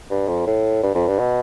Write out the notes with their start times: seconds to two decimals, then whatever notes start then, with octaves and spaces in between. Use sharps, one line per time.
0.11 G2
0.28 F2
0.47 A2
0.83 G2
0.95 F2
1.08 G2
1.20 B2